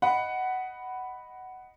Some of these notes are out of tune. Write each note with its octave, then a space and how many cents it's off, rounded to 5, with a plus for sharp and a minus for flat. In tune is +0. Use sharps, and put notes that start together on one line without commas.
D#5 +0 F#5 +10 B5 +0